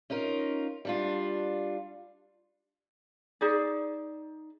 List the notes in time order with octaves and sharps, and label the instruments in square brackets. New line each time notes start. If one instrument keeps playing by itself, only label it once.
[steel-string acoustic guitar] C#4 D#4 F4 A#4
G3 D4 F4
[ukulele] D#4 G#4 D5